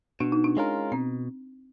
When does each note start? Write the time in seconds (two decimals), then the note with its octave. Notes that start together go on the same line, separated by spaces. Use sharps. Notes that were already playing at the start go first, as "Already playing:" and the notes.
0.20 B2 D4
0.32 D#4
0.44 D4
0.57 G#3 C#4 F4 A#4
0.92 B2 C4